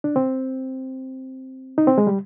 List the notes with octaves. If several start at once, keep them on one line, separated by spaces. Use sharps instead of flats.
D4
C4
D#4
C4
G#3
G3